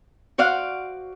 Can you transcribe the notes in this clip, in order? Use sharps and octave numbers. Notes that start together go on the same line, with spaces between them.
F#4 C5 D5 F5 F#5